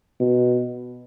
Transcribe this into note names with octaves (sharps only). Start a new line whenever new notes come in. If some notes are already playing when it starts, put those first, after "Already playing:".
B2